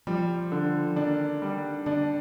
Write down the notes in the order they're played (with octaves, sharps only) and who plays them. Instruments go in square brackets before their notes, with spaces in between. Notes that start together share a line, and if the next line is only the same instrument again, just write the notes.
[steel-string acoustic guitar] F3 [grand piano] G3
[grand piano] D3
[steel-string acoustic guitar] D#3 [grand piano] D4
[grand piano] G3
[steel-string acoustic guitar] D3 [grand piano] D4